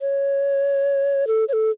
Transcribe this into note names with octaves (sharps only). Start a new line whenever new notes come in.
C#5
A4
C#5
A4